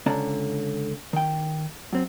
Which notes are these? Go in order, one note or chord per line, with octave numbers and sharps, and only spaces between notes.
C#2 D3 C#4 D5 A5 A#5
D#3 G5
F#2 C4